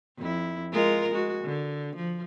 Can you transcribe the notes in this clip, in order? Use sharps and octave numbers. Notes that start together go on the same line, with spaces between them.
F2 E4
G#3 F4 A#4
G#3 F#4
D3
F3